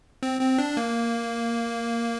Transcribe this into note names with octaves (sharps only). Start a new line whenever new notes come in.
C4
C4
D4
A#3